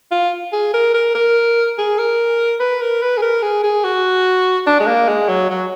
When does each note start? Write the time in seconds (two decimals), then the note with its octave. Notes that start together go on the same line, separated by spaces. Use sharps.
0.11 F4
0.53 G#4
0.74 A#4
0.94 A#4
1.15 A#4
1.78 G#4
1.98 A#4
2.60 B4
2.81 A#4
3.02 B4
3.18 G#4
3.22 A#4
3.43 G#4
3.64 G#4
3.84 F#4
4.67 D4
4.80 G#3
4.87 A#3
5.08 G#3
5.29 F#3
5.50 F#3